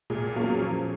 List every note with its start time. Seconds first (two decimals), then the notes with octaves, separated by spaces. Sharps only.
0.10 A#2 G#4
0.35 F#3 A#3 C#4
0.60 F3